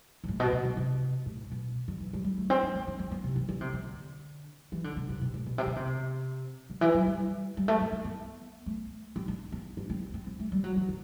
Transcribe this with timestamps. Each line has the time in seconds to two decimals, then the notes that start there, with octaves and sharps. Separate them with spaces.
0.24 G2
0.28 A2
0.40 B2
0.53 C3
0.65 D3
0.77 C3
1.26 A2
1.52 B2
1.88 D3
2.01 E3
2.13 G3
2.25 G3
2.38 A3
2.50 C4
2.63 C4
2.74 C4
2.87 D4
2.99 C4
3.11 B3
3.24 C3
3.36 E3
3.49 D3
3.61 C3
3.73 D3
4.72 E3
4.84 D3
4.96 C3
5.09 C3
5.21 C3
5.34 A2
5.46 B2
5.58 C3
5.66 D3
5.76 C3
6.70 D3
6.81 E3
6.94 F#3
7.07 G3
7.57 G3
7.68 A3
7.81 C4
7.92 C4
8.05 B3
8.66 A3
9.16 C4
9.28 D4
9.52 B3
9.77 D4
9.90 C4
10.02 C4
10.14 C4
10.26 C4
10.40 A3
10.52 G3
10.64 F#3
10.76 E3
10.89 D3